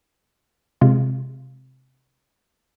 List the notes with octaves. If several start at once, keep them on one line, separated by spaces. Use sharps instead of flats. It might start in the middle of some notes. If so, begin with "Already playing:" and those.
C3 G#3 F4